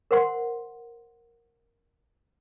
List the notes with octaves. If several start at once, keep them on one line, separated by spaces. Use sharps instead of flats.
A#4 C5 F#5 C6